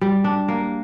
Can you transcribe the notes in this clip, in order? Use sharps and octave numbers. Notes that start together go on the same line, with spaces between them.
G3
D4
A#3